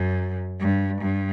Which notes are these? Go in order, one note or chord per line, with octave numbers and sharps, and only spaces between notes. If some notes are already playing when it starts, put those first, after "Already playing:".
Already playing: F#2
G2
G2